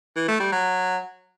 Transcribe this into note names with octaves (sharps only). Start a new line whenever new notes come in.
E3
A3
G3
F#3